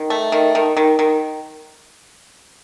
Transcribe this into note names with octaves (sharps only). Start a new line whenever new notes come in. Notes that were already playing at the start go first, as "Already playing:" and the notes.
Already playing: D#3
A3
D#3
D#3
D#3
D#3